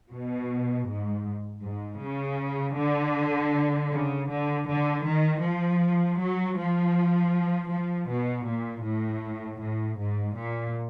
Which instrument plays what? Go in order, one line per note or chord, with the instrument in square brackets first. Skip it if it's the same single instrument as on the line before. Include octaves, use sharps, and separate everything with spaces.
[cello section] B2
G#2
G#2
C#3
D3
C#3
D3
D3
D#3
F3
F#3
F3
F3
B2
A#2
A2
A2
G#2
A#2